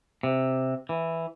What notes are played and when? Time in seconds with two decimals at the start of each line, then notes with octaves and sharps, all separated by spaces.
0.23 C3
0.89 E3